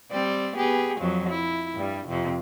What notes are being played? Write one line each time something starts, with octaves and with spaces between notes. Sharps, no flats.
G3 C4 D5
B3 G4 G#4
F2 F3 F#3
E4
G2 G3
F2 C3